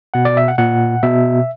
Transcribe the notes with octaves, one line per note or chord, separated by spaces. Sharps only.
B2 F#5
D5
E5
F#5
A#2 F#5
B2 E5